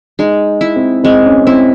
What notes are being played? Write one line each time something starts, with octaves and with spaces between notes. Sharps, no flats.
G#3 D#4
E4
C4
G#3 C4
C#4
C4 E4